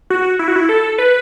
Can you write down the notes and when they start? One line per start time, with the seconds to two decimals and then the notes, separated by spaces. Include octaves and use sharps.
0.10 F#4
0.39 E4
0.48 F#4
0.56 E4
0.69 A4
0.98 B4